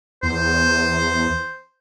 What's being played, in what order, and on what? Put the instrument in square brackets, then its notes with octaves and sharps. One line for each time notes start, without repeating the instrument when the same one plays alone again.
[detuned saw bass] E2 [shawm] C5